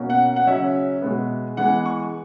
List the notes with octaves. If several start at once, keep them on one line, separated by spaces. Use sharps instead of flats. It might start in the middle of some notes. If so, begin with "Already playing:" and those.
Already playing: B2 A#3 C#4
F#5
F#5
C#3 F#3 C#4 E5
B2 G#3 B3
E3 G#3 B3 F#5
C#6